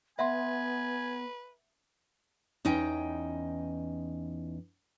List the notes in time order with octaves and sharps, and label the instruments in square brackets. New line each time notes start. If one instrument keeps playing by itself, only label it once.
[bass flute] B3 [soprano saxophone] B4 [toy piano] E5 F#5 C6 [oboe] G#5
[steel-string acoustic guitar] E2 C#4 D#4 D#5 G5